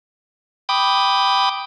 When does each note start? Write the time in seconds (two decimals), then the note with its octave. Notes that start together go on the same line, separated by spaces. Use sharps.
0.69 G5 B5 D6 D#6